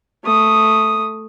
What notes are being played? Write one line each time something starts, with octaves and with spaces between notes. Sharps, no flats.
A3 D#6